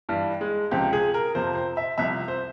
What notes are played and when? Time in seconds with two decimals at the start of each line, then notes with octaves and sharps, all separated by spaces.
0.09 G2 E3 G3
0.41 G#3
0.71 C#2 C3 F3 G4
0.93 G#4
1.14 A#4
1.35 F2 C3 F3 C5
1.55 C5
1.77 E5
1.98 C2 C3 F3 E5
2.28 C5